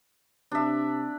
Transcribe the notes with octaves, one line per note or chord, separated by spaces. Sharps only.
C3 D4 E5